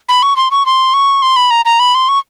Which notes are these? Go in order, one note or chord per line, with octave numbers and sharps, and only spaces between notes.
B5
C#6
C6
C#6
C6
C#6
C6
B5
A#5
A#5
B5
C6
C#6